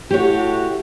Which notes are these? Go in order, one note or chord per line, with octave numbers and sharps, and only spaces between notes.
A2 A3 F#4 G4 C#5